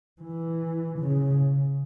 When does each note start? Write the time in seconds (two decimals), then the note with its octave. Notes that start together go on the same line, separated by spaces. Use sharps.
0.22 E3
0.99 C#3